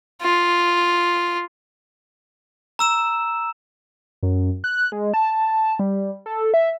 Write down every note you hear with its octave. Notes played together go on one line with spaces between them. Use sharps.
F4
A#5 E6 E7
F#2
F#6
G#3
A5
G3
A4
E5